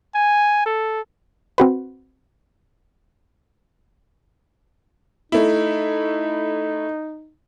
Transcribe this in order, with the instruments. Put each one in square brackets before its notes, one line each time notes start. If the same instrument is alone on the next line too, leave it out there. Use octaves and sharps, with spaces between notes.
[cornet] G#5
A4
[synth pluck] C4 F#4 B4
[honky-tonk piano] A3 E4 [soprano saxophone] D#4